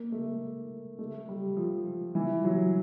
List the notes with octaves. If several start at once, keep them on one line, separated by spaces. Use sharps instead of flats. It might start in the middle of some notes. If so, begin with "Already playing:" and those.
Already playing: A#3
A3
A3
G3
F3
E3
F#3